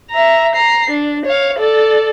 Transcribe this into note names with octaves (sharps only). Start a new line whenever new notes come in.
E5 A#5
A#5 C7
D4
C#5 F5
A4 D5